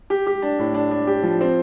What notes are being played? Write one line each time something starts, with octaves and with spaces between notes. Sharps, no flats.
G4
G4
D4
A2
D4
D4
G4
F3
C4